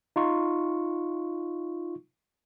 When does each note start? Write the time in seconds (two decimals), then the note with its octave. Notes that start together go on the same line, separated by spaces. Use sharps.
0.16 D#4 F4 C#6